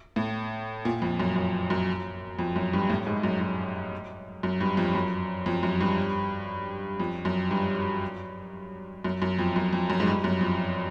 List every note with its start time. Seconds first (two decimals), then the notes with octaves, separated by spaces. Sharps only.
0.16 A2
0.85 A#2
1.02 F2
1.20 F#2
1.36 F#2
1.70 F#2
2.39 F2
2.56 F#2
2.73 G2
2.90 A2
3.07 G#2
3.23 F#2
3.41 F#2
4.43 F#2
4.61 G2
4.77 F2
4.95 F#2
5.46 F2
5.63 F#2
5.81 G2
7.00 F2
7.25 F#2
7.51 G2
9.04 F#2
9.22 F#2
9.39 F2
9.56 F#2
9.73 F2
9.90 F#2
10.00 G#2
10.07 G2
10.24 F#2
10.41 F2